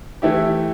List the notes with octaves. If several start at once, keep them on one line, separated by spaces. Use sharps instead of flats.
E3 A3 E4 G4